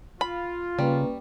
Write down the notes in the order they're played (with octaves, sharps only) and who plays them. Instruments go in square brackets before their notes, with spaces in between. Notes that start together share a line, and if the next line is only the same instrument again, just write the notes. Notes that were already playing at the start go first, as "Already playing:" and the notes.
[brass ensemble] F4 [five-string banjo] B5
[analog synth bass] C#3 [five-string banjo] G3 [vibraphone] A#3 C#4 B4